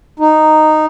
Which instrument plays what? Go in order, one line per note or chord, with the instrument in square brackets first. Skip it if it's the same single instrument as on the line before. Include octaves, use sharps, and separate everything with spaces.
[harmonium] D#4